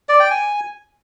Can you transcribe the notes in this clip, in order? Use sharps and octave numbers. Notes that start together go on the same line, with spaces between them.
D5
G5
G#5